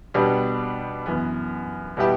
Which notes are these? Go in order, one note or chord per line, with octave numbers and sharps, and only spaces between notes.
B2 G3 B3 D4 G4
F#2 E3 B3
B2 G3 B3 E4 G4